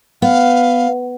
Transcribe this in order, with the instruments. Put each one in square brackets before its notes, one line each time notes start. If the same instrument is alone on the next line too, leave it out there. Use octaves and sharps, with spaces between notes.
[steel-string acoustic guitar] B3 [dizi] F5